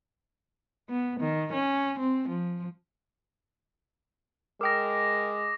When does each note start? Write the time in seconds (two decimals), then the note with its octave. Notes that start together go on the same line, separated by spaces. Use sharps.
0.89 B3
1.20 D#3
1.53 C#4
1.99 C4
2.28 F3
4.61 G#3 A#4 G5 D6 D#6 A#6